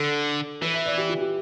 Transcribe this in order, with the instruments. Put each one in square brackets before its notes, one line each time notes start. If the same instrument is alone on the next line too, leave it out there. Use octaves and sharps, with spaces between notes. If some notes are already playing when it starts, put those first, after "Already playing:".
Already playing: [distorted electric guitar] D3 [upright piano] A4
[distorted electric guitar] E3 [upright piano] B4
[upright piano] E5
D5
G4
F4
G4